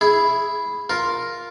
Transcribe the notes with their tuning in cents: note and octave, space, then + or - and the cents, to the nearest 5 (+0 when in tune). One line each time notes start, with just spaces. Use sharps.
E4 +0 G#4 +0
F4 +5 A#4 +0